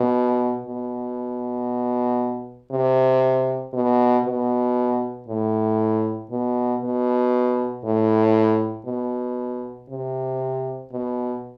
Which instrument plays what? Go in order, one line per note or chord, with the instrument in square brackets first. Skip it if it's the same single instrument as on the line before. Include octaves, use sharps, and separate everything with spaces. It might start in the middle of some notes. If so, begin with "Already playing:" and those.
Already playing: [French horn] B2
B2
C3
B2
B2
A2
B2
B2
A2
B2
C3
B2